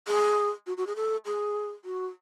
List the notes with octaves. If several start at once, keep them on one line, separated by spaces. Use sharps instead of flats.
G#4
F#4
F#4
G#4
A4
G#4
F#4